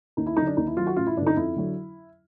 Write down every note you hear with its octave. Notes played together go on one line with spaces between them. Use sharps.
D#2 D#4
E4
F#3 D#4
D3
D4
D#2 D#4
E4
D#3 F#3 F4
F#4
A1 F4
E4
G2 D3 D4
D#4
F2 E4
D3 F#3